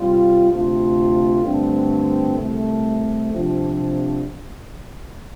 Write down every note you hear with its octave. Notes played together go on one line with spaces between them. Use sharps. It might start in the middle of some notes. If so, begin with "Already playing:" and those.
Already playing: C3 G3 F4
D2 C3 A3 F4
G2 D3 A3 C4
C2 C3 A3
C2 C3 F3 D4